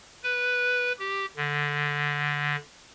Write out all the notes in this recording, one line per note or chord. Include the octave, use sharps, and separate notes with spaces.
B4
G4
D3